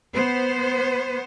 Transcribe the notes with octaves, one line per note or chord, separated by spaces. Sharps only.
B3 C5